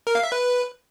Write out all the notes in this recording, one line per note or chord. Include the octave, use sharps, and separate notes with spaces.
A#4
F5
E5
B4